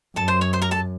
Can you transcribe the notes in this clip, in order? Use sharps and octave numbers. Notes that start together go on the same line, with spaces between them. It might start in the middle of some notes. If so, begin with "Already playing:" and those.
F#2 A4 A5
C5 C6
C#5 C#6
C5 C6
A#4 A#5
A4 A5